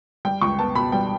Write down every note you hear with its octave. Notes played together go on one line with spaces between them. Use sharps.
G3 G5
C#2 C#6
B3 A5
B2 B5
G3 G5